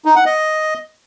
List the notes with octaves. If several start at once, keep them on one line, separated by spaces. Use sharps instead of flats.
D#4
F#5
D#5